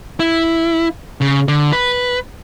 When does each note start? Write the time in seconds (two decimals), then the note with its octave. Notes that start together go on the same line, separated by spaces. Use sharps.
0.20 E4
1.21 C#3
1.48 D3
1.73 B4